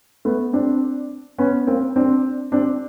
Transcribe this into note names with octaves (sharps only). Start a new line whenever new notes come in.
A3 B3
C4 D4
B3 C#4
A#3 C4
C4 D4
C4 D4